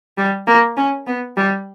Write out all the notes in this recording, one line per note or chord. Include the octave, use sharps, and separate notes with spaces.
G3
A#3
C#4
B3
G3